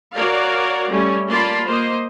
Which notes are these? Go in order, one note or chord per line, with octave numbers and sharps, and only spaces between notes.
F#4 A#4 C#5 D5 F5
G3 A3 C#4
A#3 F4 D5 A5 B5 C6
A#3 C5 D#5